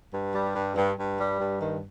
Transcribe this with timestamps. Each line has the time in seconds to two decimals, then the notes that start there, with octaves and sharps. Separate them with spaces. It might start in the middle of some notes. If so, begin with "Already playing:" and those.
0.12 G2
0.33 G3
0.54 G2
0.75 G2
0.97 G2
1.19 G3
1.39 G2
1.60 D#3